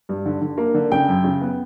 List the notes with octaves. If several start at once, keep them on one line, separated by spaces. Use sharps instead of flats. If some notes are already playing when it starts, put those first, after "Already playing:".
G2
D3
D3
A#3
D3
C#3 G5
F#2
C#3
B3